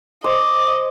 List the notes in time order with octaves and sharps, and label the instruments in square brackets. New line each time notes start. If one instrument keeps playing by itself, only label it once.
[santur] C5 [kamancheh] D#5 [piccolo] D6